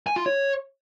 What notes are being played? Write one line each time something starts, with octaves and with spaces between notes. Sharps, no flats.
G#5
F4
C#5